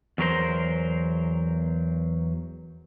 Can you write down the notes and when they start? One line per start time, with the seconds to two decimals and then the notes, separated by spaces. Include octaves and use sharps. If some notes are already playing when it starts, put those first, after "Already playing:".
0.18 E2 F#3 A#4 C5